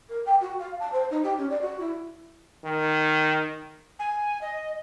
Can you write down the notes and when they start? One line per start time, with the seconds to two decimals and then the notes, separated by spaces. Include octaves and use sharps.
0.09 A#4
0.26 G5
0.41 F#4
0.60 F5
0.80 A5
0.93 C5
1.11 D#4
1.23 G4
1.38 C#4
1.50 D5
1.62 F#4
1.80 E4
2.64 D#3
3.99 G#5
4.41 D#5